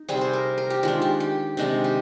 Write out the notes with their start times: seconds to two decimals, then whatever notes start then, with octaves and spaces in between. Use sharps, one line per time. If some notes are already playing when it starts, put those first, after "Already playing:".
Already playing: D#4
0.08 C3 G3 C4 G#4
0.21 C5
0.33 A#4
0.58 A#4
0.70 G4
0.83 D#3 G#3 D4 F4
1.02 G4
1.20 G4
1.57 C3 D#3 G#3 D4
1.84 G4